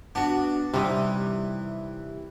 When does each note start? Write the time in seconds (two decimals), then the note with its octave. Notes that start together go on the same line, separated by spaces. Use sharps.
0.15 B3 D4 F#4
0.74 C3 E3 G3 D#4